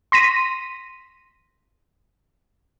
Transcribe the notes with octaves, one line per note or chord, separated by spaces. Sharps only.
C6 A#6 B6 D#7